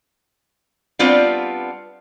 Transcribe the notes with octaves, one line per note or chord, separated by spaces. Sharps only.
G3 B3 C4 D4 F4